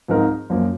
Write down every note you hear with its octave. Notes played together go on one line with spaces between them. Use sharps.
G#2 F3 C4 D#4 A#4
F#2 F3 A#3